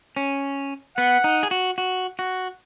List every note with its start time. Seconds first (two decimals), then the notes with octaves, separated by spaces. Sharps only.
0.16 C#4
0.97 B3 F#5
1.24 D#4
1.43 G#4
1.51 F#4
1.78 F#4
2.19 F#4